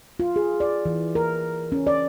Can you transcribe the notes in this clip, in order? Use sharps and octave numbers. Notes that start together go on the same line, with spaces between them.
F4
G#4
D5
E3
A#4
C#4
D5